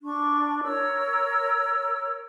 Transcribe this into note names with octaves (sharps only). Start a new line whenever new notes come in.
D4 C#6
A#4 C#5 E6